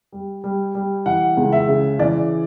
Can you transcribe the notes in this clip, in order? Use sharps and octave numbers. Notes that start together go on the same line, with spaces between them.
G3
G3
G3
E3 F#5
C#2
E5
C#3
E3 D5